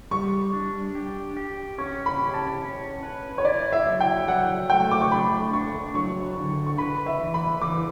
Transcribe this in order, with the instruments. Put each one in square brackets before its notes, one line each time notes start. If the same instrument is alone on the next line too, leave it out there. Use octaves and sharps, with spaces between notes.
[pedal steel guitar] G3 [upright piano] C#6
[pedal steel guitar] D4
G4
G4
[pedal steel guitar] C#4 [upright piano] C#6
[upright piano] B5
[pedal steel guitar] G4
[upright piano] A5
[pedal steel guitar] C#4
B4
[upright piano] C#5
[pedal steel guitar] E4 [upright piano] D5
[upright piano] E5
[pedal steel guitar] F#3
[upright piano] G5
[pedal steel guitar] F#3 [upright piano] F#5
[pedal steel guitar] A3 [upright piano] G5
[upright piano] D6
C#6
[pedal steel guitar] D4 [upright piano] B5
[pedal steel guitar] D4 [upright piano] C#6
[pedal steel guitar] F#3 [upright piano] C#6
[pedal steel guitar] D3
[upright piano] C#6
[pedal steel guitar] B4 [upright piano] B5
[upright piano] E5
[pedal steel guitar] E3
[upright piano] B5
[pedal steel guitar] E3 [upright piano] D6